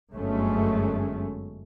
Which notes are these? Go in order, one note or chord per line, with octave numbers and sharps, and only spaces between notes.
G1 F#2 G#3 A3 C#4